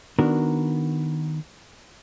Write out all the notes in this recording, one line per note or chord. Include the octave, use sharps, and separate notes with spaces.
D#3 B3 D4 F#4 A#4